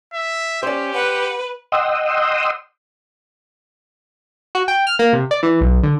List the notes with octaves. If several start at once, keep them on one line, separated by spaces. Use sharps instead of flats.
E5
C#4 G4 C5 D5
B4 F#5
D#5 F#5 G5 C6 D#6 E6
F#4
G5
F6
A#3
C3
D5
E3
B1
D3